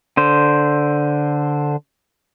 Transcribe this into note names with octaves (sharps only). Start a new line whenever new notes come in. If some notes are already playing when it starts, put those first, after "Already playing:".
D3 C5